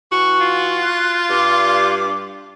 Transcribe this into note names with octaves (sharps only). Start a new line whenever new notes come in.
E3 F#4 C#6
F4
F#6
G2 D6